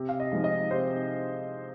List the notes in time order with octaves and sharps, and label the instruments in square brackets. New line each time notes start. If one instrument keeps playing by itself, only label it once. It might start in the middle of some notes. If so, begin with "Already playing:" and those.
Already playing: [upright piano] C3
F5
D#5
F3 G#3 D#4
D#5
C3 C5